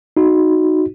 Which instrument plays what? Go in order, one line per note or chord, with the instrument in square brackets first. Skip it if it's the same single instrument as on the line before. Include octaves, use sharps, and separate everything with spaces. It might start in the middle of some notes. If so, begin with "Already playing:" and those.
[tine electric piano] D#4 F#4